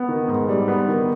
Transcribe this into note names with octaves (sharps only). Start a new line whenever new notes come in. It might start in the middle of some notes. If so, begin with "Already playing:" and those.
Already playing: B3
D#3
G#2
G3
B3
D#3